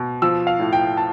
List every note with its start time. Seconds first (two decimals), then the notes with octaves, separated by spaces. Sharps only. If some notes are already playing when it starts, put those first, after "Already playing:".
Already playing: B2
0.22 F3 E6
0.47 F5
0.59 A2
0.73 G5
0.97 A5